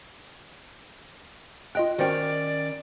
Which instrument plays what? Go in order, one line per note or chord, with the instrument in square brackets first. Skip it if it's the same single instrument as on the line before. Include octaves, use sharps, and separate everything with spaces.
[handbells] F4 D#5 F#6 [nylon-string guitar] G5
[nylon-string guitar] D#3 C#4 [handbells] F#4 C5 G5 [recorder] D5